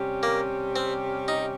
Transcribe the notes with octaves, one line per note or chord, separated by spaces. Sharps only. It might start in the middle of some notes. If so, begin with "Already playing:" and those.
Already playing: C3 G3 C#4 G4
A#3
C4
D#4